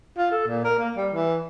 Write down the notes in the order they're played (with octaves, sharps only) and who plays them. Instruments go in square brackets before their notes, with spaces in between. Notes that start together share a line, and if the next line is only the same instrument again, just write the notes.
[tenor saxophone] F4
A4
A#2
A#4
A#3
G3
E3